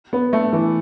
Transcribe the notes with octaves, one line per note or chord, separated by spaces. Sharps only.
B3
A3
E3